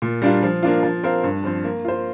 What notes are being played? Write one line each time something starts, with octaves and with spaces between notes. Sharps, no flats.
A#2
G3 A#3 D4 F4
F3
A#3 D4 F4
F3
C4 A#4 F5
G2
F3 C4
A#3
F4 C5